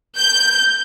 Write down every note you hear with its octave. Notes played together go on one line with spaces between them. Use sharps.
G6